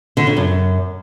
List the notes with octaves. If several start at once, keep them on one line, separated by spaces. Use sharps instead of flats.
D3
C#3
F#2